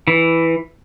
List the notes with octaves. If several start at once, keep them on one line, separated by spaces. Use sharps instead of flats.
E3